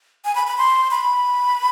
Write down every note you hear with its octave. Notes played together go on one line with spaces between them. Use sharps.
G#5
B5
B5
C6
B5